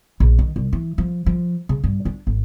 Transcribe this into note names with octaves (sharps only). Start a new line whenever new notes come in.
A#1
D#3
C2
E3
F3
F3
C#3
G2
D4
G#1